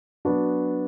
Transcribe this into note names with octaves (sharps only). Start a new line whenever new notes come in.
F#3 B3 D4 F#4